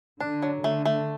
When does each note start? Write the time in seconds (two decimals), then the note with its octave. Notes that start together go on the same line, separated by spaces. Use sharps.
0.20 D3 D4
0.43 F#3
0.64 D3 A3
0.85 A3